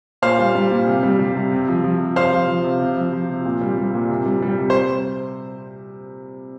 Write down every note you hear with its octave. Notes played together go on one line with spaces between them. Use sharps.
A#2 C5 F5
G3
G3
A#2
C3
G3
G3
C3
C3
F3
F3
C3
C3 C5 F5
F3
F3
C3
C3
F3
F3
C3
A#2
G3
G3
A#2
C3
G3
G3
C3
C5